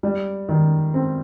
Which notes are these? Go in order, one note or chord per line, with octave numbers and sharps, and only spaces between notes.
G3
D#3
C4